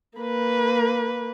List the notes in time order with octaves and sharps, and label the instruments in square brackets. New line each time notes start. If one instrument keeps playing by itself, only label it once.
[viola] A#3 B4